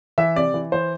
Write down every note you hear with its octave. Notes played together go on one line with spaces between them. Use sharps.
E3 E5
C3 D5
E3
E3 C5